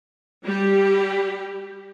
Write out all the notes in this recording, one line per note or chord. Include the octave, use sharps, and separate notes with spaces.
G3 G4